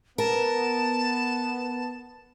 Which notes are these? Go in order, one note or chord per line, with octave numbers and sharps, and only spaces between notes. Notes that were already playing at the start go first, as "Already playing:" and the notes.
B3 A#4 A5